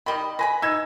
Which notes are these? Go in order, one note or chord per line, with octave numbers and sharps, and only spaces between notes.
D#3 G3 D#5 B5
B4 G#5 B5 A#6
D#4 E6 G#6 E7